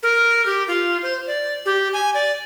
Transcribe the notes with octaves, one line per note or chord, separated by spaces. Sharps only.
A#4
G4
F4
C5
D5
G4
G#5
D5